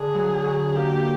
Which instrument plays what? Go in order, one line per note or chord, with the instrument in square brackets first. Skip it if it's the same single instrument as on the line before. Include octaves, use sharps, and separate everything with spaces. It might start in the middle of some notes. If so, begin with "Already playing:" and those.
Already playing: [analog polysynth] D3 [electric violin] G#4
[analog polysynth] F#3
F#3
[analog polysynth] A#3 [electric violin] G4